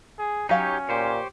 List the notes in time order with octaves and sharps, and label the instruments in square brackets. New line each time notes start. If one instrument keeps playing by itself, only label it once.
[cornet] G#4
[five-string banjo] F#3 F5 F#5 [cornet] C#4 [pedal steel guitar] D#4 G4 C#5
[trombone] A#2 [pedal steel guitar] G4 C5 C#5